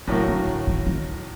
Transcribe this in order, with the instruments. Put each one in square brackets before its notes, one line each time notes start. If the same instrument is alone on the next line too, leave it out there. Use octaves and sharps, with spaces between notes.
[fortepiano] A2 F#3 A#3 [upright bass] C#3
[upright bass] D3
D#3
D#3
D#3